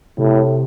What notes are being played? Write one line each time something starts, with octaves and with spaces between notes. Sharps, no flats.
A2 C3